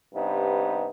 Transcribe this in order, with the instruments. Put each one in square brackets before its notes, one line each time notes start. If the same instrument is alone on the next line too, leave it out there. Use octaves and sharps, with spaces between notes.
[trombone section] G2 C3 B3 D#4